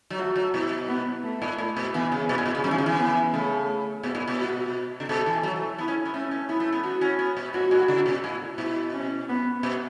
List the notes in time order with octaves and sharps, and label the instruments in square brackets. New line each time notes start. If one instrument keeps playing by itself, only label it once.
[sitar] F#3
[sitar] A3 [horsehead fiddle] F#4
[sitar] F#3
[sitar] B2 [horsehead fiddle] E4
[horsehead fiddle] B3
A3
[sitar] A2
A2
B2
[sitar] E3 [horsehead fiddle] B3
[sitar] C#3
[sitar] B2 [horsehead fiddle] B3
[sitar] A2
B2
C#3
[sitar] F#3 [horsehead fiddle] C#4
[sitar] E3
C#3
E3
[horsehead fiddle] B3
[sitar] C#3 [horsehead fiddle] A3
[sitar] B2 [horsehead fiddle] B3
[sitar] A2
B2
[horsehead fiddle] F#4
[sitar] C#3
[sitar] B2 [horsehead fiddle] A4
[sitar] E3
F#3
A3
[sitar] B3 [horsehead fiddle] E4
[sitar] C#4
B3
[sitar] A3 [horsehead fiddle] C#4
[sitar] C#4
[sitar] B3 [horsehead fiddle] E4
[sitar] A3
B3
[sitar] B3 [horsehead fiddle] F#4
[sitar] C#4
B3
B2
[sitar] A2 [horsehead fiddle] F#4
[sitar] A2
C#3
B2
A2
[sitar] B2 [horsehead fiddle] E4
[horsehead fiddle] C#4
B3
[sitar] B2